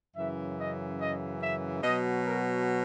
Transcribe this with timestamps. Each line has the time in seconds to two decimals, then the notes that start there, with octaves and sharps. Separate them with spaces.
0.16 F#2 C#3 E3 E5
0.58 D#5
0.99 D#5
1.42 E5
1.83 B2 F#3 D#5
2.25 A#4